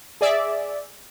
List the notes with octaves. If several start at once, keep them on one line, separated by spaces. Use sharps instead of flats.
G#4 D5 E5